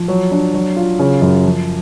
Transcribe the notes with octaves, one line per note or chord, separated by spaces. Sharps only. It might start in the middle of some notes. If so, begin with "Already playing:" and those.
Already playing: F3
F#3
D4
F#3
F4
C#3
F#2
F3